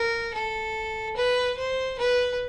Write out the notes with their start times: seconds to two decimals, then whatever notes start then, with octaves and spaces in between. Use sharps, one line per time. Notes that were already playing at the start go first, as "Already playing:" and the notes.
Already playing: A#4
0.34 A4
1.16 B4
1.57 C5
1.98 B4